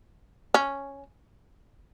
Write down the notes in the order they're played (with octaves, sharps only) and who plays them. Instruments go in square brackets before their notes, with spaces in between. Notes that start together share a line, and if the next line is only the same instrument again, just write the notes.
[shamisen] C#4